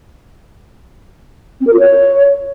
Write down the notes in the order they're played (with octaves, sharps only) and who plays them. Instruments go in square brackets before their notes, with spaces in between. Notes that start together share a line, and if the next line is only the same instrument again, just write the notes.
[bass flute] C4
A#4
F4
C#5